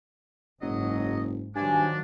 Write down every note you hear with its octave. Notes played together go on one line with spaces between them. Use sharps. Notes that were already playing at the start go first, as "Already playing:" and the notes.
F#1 G#2 F#3 D#5
G2 D#3 F3 F#3 D4 G#5